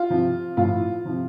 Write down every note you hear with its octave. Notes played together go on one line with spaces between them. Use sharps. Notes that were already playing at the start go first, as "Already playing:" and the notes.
Already playing: F4
C3 F3
A2 F3 F4
C3 F3